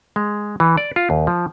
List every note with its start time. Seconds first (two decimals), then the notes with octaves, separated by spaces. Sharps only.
0.16 G#3
0.60 E3
0.77 D5
0.96 F4
1.10 D#2
1.27 F3